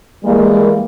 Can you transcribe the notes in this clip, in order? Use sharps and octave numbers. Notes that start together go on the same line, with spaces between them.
E3 G3 G#3 A#3